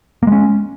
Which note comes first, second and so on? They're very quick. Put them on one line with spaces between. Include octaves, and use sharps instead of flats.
A#3 G#3 C#4